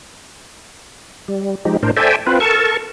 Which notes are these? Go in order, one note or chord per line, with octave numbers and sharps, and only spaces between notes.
G3
F3 G#3 D#4 G4
A2 D4 A#4 C5
A4 C5 D5 E5 G5 G#5
C4 F4 B4
A4 A#4 A5 C#6